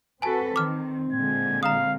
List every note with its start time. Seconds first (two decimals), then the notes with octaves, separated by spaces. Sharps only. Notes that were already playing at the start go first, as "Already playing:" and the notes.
0.22 C4 F#4 A4 B4 G#5 A5
0.56 D#3 D6 F6
1.13 A#2 D3 G#3 G#6
1.63 F5 A#5 D#6